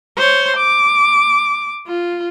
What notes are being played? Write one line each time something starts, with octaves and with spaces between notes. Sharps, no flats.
C5 C#5
D6
F4